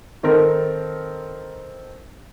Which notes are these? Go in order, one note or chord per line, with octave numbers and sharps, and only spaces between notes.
D#3 C4 A4 A#4